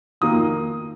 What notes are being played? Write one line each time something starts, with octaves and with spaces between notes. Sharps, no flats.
F2 D#3 A#3 D#6